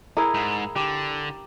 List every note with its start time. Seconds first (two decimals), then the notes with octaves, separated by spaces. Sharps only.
0.17 E4 G#4 A#4 A#5
0.34 G#2
0.76 D3 G4